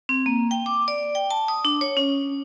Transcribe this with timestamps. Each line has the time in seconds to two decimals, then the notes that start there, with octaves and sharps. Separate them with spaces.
0.09 C4
0.26 A#3
0.51 G5
0.66 D6
0.88 D5
1.15 G5
1.30 A5
1.48 D#6
1.65 D4
1.81 C#5
1.97 C#4